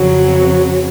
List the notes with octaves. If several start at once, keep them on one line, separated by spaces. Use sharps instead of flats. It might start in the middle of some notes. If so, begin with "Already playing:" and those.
Already playing: F2 C#3 F#3